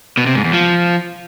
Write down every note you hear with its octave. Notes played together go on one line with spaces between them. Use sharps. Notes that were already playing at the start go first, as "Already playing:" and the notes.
B2
C3
G#2
E2
F3